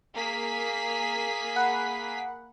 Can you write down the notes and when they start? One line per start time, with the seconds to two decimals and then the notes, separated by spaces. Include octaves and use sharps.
0.15 A#3 G#4 B6
1.56 F#5 B5 F#6